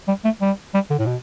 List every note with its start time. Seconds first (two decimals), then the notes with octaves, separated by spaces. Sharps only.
0.08 G3
0.25 A3
0.41 G3
0.74 G3
0.90 D3
0.99 A2
1.06 B2